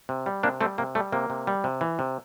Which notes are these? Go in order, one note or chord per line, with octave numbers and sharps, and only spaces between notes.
C3
G3
C3 A#3 D4
G3 A3 C4
C3 A#3
G3 A3
C3 A#3
C3
G3
C3
E3
C3